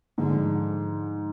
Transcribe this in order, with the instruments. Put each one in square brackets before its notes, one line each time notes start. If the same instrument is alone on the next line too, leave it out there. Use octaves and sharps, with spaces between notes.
[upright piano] G#2 F3 G#3 [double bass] D3